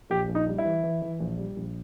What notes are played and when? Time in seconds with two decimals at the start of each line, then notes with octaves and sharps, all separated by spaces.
0.10 A#1 G4
0.29 A#1
0.35 D#4
0.47 G3
0.58 E4
0.65 E3
0.83 E3
1.02 E3
1.20 A#1
1.38 G3
1.56 A#1